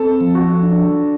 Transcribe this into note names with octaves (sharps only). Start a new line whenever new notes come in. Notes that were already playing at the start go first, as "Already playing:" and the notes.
Already playing: C4 A4
F3
F#4
D4